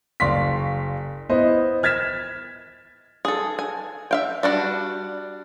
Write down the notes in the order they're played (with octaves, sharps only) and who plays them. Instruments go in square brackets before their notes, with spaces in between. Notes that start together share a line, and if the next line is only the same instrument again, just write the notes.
[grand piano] F#1 D5 F5 C6 C#6 B6
B3 E4 C5 D#5
F6 G#6 A6 B6 E7
[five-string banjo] G#4 A4
G#5
E5 F5 G5
G3 D4 F#4